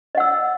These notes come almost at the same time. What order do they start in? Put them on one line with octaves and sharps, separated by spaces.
D#5 F#5 E6